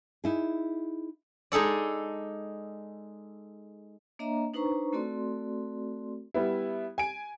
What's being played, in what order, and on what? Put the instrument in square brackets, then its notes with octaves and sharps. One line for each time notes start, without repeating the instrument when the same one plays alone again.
[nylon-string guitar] D#4 E4 G#4
[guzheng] G#3 D#4 G#4 A4 D5
[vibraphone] A#3 D4 C#5 D#5 E5 A#5
D4 D#4 B4 C5 A#5 C#6
A3 C4 F#4 A4 D5 C6
[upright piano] G3 B3 E4
G#5 D7